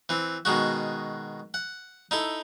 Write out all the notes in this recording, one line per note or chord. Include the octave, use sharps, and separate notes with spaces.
E3 C4
B2 D#3 G#3 F#4
F#5
D#4 E4 A4